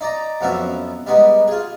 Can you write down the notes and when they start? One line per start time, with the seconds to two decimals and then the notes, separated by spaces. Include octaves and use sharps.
0.01 D#4 D5 A#5
0.41 F2 F#3 B3 C#4 E5
1.07 G3 G#3 B3 D#4
1.48 F4 G#4